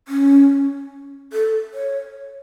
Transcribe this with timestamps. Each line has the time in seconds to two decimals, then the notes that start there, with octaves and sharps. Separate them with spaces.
0.08 C#4
1.33 A4
1.74 C#5